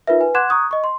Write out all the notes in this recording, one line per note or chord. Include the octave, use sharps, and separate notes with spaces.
D#4 F4 A#4 B4 E5
B4 G#5
F#5 C6 D6 F#6 G#6 E7
A#5 C#6 D#6 F#6 G#6
D#5 C#6
C6